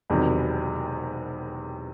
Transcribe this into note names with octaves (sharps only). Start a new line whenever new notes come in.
E1 E2 C3 D#3 F#3